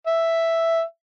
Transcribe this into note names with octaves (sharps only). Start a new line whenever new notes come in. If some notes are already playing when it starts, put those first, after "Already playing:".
E5